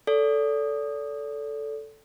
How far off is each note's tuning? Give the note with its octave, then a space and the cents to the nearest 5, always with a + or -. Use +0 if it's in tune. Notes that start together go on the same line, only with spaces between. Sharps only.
A4 +0 D5 -35